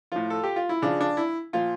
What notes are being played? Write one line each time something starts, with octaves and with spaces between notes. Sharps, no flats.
A2 F3 F4
A4
G4
F4
E4
C#3 F3 D4
D4
E4
A#2 F3 F4